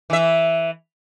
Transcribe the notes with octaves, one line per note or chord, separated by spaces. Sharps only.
E3 E5